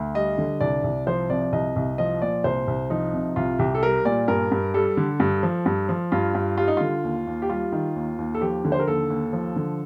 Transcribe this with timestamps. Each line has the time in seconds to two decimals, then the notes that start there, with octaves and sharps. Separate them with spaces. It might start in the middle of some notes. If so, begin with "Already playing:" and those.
Already playing: D2
0.15 G3 D#5
0.38 D3
0.61 C2 D5
0.84 C2
1.07 F3 C5
1.30 C3 D5
1.53 C2 D#5
1.76 C2
1.98 F3 D#5
2.22 A#2 D5
2.44 C2 C5
2.68 C2
2.90 F3 D#4
3.14 C3
3.36 C2 F4
3.59 C2 G4
3.75 A4
3.82 G3 A#4
4.05 A#2 D5
4.28 G2 A#4
4.52 G2
4.74 G3 A4
4.97 D3
5.20 G2
5.43 F3
5.66 G2
5.89 F3
6.12 G2 F4
6.35 G2
6.57 G3 F4
6.68 D#4
6.77 D3 F4
7.04 D#2
7.27 D#2
7.42 G4
7.49 G3 F4
7.72 D#3
7.95 D#2
8.18 D#2
8.35 A4
8.41 F3 G4
8.65 D3
8.72 C5
8.79 A#4
8.87 D#2 A4
9.10 D#2
9.33 F3
9.56 D3